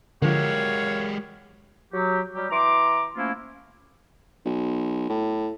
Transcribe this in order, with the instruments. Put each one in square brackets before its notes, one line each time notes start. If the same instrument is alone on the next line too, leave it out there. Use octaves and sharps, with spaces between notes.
[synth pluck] D3 F3 [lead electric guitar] G#3 G4 [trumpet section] F#4 C#5 F5 [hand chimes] A#4
[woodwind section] F#3 G4
F#3 G3 G4
E3 A#5 C6 D6
F3 A3 A#3 C#4 E4 F4
[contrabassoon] B1
A2